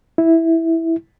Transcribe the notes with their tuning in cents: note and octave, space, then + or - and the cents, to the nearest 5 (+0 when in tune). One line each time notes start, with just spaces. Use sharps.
E4 -5